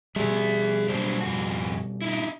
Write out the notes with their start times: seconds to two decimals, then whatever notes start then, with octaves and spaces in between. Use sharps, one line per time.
0.16 B2 G3 G#4 E5
0.89 F#3 D4 C5
1.21 F2 F#4
2.02 D#4 E4